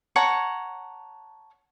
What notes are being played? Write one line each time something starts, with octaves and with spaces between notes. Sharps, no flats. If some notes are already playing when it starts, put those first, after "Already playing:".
C#5 F#5 A5 A#5